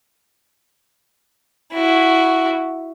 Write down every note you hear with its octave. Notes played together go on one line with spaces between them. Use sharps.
E4 F#4